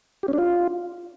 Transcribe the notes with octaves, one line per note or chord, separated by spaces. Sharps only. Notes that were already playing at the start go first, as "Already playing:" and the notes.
G4
C#4
D4
F4